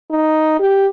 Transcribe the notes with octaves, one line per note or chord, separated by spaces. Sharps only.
D#4
G4